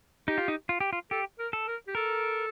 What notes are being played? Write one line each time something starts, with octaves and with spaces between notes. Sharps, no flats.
D#4 G4
F4
D#4
F4
G4
F4
G4 A4
A#4
A4
A#4
G4
A4 A#4